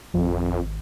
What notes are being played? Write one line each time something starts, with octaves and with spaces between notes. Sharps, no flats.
G#1 F2